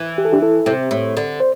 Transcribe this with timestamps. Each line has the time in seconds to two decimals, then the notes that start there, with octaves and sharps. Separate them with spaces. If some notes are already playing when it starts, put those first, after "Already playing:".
Already playing: E3
0.18 G4
0.25 A4
0.33 D4 G4
0.42 E4 A4
0.66 C3
0.91 A2
1.17 D3
1.40 C5